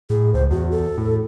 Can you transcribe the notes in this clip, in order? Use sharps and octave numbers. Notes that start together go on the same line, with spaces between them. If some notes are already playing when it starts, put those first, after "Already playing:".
A2 G#4
C#2 C5
E2 F#4
A4
A2